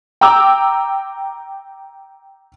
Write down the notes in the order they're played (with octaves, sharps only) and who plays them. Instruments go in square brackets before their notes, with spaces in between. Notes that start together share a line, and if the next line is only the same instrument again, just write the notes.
[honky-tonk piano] G5 A#5 D6 E6